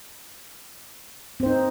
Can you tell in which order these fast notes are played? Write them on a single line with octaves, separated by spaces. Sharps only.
C4 C5 D#4